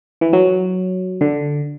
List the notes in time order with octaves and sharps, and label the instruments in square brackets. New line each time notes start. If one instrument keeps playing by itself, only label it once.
[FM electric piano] E3
F#3
D3